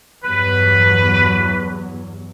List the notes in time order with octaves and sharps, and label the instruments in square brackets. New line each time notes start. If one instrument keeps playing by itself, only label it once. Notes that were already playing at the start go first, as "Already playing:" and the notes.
[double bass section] E2 G2 F#3 [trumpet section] B4